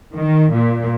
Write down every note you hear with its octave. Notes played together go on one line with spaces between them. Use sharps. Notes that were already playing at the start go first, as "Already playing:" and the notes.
D#3
A#2